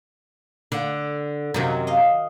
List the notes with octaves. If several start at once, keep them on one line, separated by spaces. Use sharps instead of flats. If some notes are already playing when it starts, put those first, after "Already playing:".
D3 F#5
F#2 C3 D#3 F#3
D#5 F5